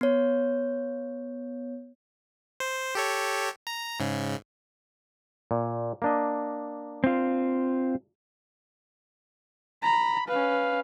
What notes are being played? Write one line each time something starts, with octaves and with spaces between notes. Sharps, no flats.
B3 C#5
C5
G4 A4 C#5
A#5
G#2 C#3
A#2
A#3 D4 D#5
C4 F4
A#5 B5
C#4 B4 F5